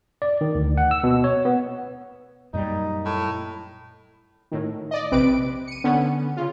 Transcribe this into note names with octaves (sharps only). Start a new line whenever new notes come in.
D5
D#3
D2
F#5
E6
B2
C#5
B3
F#2 A#2 G3 D#4
A2
A2 D#3
D5 D#5
A#1 C3 C4 B4 D6 D7
C#7 D#7
D3 B3 C#4
C#3 F4